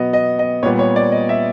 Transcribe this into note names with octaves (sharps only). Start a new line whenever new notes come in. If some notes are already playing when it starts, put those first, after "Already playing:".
Already playing: B2 F#3 B3 D#5
D#5
D#5
A#2 G3 B3 C#5
C#5
D5
D#5
E5